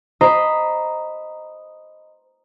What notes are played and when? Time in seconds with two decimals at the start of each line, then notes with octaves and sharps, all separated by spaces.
0.21 C5 D#5 A#5 B5